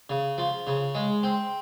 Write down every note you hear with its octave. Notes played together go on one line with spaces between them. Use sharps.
C#3
F3
C#3
G#3
C4